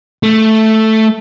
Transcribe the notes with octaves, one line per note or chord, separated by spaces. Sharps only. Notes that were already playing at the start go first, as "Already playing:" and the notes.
A3